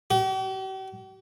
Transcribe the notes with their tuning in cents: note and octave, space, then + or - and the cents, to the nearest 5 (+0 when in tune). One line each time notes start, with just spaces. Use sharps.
G4 -45